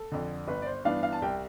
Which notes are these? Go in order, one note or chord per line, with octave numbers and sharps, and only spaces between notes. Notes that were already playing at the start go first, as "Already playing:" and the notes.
Already playing: A4
F2 D3
G1 B4
D5
C5
G2 E3 B3 D4 F5
F5
A5
C2 G5